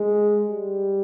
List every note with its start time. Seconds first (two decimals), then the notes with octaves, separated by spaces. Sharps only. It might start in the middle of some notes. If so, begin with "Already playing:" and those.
Already playing: G#3
0.47 G3